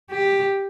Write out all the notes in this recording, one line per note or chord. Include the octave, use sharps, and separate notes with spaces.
G4